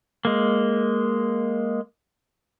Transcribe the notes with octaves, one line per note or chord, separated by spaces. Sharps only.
G#3 A#3